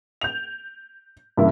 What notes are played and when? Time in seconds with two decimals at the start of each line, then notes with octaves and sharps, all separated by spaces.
0.21 G6 F7
1.37 G2 C#3 E3 A#3 E4